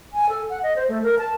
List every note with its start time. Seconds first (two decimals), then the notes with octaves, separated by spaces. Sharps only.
0.13 G#5
0.29 A4
0.50 F#5
0.63 D#5
0.76 C5
0.89 A3
1.03 A#4
1.18 A5